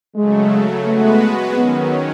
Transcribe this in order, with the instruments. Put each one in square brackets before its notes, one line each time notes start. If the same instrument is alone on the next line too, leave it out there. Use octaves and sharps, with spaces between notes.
[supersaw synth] C#3 F#3 A3 [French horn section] G#3
[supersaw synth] G#3 B3 F#4 B4 [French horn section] A3
[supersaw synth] D#3 F#3 C#4 [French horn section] B3